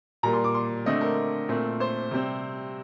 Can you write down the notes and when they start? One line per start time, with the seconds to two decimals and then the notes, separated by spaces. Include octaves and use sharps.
0.23 A#2 G3 A#3 A#5
0.33 C6
0.44 D6
0.54 C6
0.86 D3 A3 C4 D#5
1.01 A#4
1.48 A#2 A3 C4
1.80 C5
2.11 C3 G3 C4